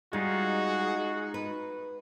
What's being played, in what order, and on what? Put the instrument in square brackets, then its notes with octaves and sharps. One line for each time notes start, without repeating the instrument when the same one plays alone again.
[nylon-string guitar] G3 [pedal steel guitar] G#3 D#4 F4 [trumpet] F#4 [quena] G#4
[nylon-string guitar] B4